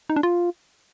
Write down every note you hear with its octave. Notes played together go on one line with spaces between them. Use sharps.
D#4
D4
F4